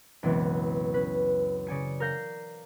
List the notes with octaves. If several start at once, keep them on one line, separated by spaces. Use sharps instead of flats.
C#2 F#2 B2 E3 B3 C4
C#4 B4
C#3 D5 G#5 C#7
A#4 F5 G6 A#6 C7